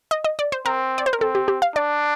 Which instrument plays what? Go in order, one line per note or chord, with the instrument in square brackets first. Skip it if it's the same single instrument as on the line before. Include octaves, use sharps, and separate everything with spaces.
[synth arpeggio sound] D#5
D#5
D5
C5
[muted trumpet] C4 [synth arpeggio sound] A#4
[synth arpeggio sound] D5
C5
A#4
[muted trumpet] C4 [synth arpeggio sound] A4
[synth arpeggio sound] G4
G4
F5
[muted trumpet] D4 [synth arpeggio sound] D5